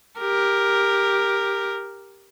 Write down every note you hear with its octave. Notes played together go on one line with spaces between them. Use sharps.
G4 A#4